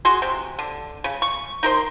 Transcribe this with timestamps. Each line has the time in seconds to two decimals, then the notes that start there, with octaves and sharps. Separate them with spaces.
0.05 F#4 G#4 C6
0.22 C3
0.59 D3
1.04 C#3
1.22 C#6
1.63 D#4 A#4 C5 C6